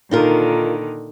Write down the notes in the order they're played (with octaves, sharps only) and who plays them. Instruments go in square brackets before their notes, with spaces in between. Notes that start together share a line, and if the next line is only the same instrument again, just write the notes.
[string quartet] A#2 D3 D#3 [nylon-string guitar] D#4 F4 A#4